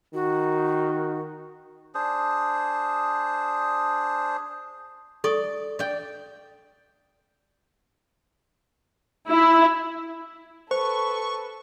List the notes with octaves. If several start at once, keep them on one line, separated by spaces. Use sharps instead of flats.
D#3 F#4
D4 G#4 C5
A4 D5 C#6 D#6
D5 G5
E4
A4 B4 C5 C#6